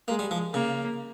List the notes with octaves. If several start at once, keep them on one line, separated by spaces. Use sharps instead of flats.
G#3 A#3
G3
F3
C#3 A#3